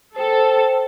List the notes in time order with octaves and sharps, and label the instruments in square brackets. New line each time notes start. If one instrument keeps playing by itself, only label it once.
[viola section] A4 [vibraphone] C5 G5